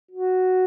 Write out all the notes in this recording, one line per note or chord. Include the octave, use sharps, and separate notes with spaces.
F#4